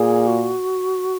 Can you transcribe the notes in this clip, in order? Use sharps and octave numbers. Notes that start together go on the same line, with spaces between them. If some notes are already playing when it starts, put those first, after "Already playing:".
Already playing: A#2 G#4
F#4